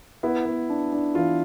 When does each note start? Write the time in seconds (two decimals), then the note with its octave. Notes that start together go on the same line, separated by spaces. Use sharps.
0.23 B3 E4
0.46 B3
0.70 D4
0.92 D4
1.15 E3 F4